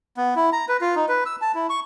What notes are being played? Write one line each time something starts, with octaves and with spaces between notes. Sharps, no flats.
B3
E4
A#5
B4
F4
D#4
B4
E6
A5
E4
C#6